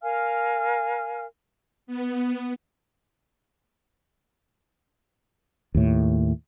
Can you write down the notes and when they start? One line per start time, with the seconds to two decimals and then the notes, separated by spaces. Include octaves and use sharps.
0.03 A#4 F5 G#5 F6
1.87 B3
5.75 D#2 A2